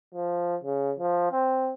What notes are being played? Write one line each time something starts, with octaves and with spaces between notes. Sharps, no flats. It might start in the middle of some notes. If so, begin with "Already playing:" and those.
F3
C#3
F3
C4